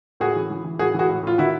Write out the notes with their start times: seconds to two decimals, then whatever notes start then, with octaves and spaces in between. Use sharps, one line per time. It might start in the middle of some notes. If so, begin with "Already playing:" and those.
0.20 A2 F#4 G#4
0.36 E3
0.50 E3
0.65 E3
0.79 A2 F#4 G#4
0.94 E3 F#4 G#4
1.09 A2
1.23 A2 F4
1.38 D#3 E4 F#4